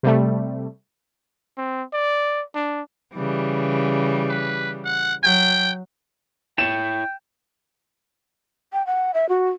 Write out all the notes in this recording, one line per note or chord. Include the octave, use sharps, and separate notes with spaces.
C3 G3 A3
C4
D5
D4
C#3 E3 G3
B4
F#5
F#3 G5
E4 C#5 G5 E7
G5
F#5
E5
F#4